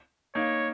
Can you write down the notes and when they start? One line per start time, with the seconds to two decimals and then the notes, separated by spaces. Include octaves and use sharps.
0.35 A#3 D#4 C#5